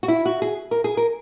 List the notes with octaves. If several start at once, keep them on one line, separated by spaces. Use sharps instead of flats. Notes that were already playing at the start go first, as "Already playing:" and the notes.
F#4
E4
F#4
G#4
A#4
G#4
A#4